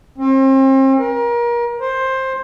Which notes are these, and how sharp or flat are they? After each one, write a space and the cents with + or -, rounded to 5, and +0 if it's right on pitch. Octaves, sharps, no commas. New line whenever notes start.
C4 +40
A#4 +30
C5 +15